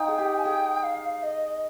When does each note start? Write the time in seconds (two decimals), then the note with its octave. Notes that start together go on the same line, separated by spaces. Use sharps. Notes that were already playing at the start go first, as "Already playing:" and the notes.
Already playing: D#4 F4 G5
0.08 G#4
0.19 G4
0.38 G#5
0.44 G#4 G5
0.83 F5
1.23 D#5